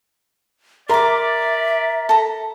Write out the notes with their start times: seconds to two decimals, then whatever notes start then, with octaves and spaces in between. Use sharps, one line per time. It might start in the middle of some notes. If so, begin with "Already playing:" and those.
0.89 A#4 D5 E5 A#5 C6 D6
2.09 A4 A#5